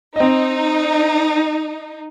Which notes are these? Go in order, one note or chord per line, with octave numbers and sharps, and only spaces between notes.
C4 D#4 D#5